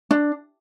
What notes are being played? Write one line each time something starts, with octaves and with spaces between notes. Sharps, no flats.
D4